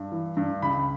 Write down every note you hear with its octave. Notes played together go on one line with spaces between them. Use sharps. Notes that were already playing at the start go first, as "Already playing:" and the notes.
Already playing: G2
E3
G2
C#2 B5